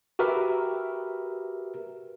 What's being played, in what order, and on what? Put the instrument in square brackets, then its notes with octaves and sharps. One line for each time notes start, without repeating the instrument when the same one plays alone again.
[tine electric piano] F#4 G4 A#4 B4 E5